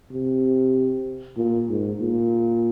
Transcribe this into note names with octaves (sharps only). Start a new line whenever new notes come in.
C3
A#2
G#2
A#2